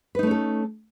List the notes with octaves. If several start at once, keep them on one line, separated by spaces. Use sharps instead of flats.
A3 C#4 D#4 A4 B4